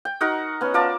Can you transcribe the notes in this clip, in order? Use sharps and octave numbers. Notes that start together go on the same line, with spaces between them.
G5
D#4 F#4 A#4 F#5
B3 C#4
F4 A#4 D5 A5